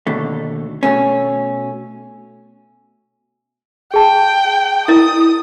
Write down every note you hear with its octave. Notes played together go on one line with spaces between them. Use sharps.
D#2 B2 D3 A3
B2 A3 C#4
G#4 G5 A5
E4 A#4 D#5 D#6